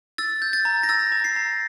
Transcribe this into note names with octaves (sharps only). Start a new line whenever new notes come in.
E6 A6
G6
A6
A#5
A#6
E6 A6
A#5
C7
A#5